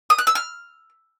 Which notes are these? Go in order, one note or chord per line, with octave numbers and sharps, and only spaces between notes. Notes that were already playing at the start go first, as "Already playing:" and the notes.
D#6
F#6
E6
F6